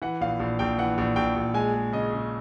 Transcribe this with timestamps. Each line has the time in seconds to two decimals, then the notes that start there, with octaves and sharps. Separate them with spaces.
0.02 E3 F#5
0.21 A#1 F5
0.40 A#1
0.59 A#1 G5
0.78 E3 F#5
0.98 A#1
1.16 A#1 G5
1.36 A#1
1.54 G#3 G#5
1.74 G#3
1.92 C#3 D#5
2.12 C#3